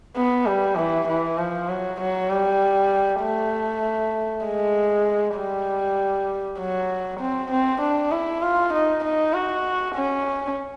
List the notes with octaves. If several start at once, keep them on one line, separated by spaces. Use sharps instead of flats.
B3
G3
E3
E3
F3
F#3
F#3
G3
A3
G#3
G3
F#3
C4
C4
D4
E4
F4
D#4
D#4
F#4
C#4